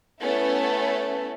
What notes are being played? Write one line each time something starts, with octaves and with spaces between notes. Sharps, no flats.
A3 B3 C#4 E4 A4 B4